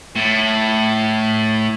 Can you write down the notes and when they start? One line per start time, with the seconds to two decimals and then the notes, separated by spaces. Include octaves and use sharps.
0.16 A2